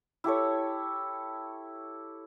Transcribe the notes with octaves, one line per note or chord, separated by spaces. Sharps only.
E4 G4 A4 C#5